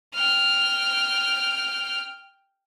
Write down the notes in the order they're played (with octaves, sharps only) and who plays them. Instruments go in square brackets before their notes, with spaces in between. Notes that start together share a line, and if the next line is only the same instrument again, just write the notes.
[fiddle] G5 F6